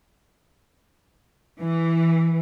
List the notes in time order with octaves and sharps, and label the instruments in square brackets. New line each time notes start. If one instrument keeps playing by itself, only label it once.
[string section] E3